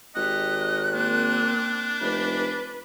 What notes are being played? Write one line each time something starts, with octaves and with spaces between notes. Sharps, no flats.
G#1 G4 D#5 F#6
A#3 C4 D4
F1 B4